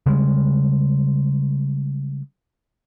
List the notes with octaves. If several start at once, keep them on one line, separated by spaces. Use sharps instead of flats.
C#3 G3 G#3